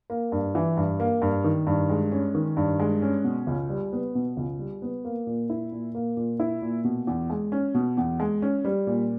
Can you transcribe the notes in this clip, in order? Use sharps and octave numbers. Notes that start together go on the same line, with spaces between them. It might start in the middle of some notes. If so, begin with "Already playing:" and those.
A#3
G2
E3
G2
A#3
G2
D#3
G2
G#3
C#4
D#3
G2
G#3
C#4
B2
C#2
G3
B3
B2
C#2
G3
B3
A#3
A#2
E4
A#2
A#3
A#2
E4
A#2
B2
E2
G#3
C#4
B2
E2
G#3
C#4
G3
A#2